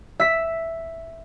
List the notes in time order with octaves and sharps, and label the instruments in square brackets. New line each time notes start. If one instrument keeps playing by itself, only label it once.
[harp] E5 B6